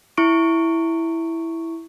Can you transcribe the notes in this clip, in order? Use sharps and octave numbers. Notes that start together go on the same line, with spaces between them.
E4 C#6 D7